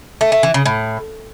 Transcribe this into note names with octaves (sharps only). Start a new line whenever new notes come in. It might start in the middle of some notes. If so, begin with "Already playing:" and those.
A3
A3
E3
C#3
A2